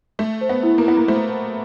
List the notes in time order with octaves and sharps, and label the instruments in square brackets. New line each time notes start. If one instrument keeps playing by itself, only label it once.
[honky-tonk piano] A3 [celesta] A4
[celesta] C5
[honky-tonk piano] B3
[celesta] E4
[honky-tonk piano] A#3
[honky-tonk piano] B3 [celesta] E4
[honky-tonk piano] A#3
[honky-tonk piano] A3 [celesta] C5
[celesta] C5